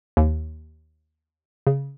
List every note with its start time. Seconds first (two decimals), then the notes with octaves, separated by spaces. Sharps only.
0.17 D#2
1.67 C#3